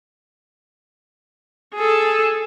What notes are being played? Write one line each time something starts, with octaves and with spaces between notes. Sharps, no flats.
G#4 A4